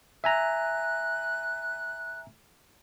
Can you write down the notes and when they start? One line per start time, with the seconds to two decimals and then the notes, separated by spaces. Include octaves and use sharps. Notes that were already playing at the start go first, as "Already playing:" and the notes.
0.24 E5 G#5 A#5 F#6